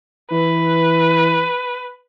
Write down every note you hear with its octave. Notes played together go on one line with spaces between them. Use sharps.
E3 B4